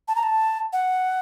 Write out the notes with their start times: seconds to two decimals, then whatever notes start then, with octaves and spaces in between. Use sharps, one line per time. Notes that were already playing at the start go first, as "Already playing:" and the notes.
0.08 A5
0.16 A#5
0.23 A5
0.73 F#5